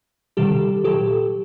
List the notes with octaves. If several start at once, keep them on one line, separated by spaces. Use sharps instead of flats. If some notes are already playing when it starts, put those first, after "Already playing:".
C3 D#3 G3 G4 A4
A#2 F#3 G4 A4